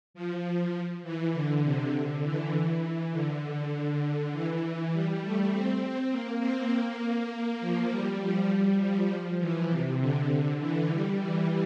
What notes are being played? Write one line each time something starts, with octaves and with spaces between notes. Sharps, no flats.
F3
E3
D3
C3
D3
E3
E3
D3
D3
D3
E3
G3
A3
C4
A#3
C4
A#3
A#3
F3
G3
F3
G3
F3
E3
C3
D3
E3
G3
E3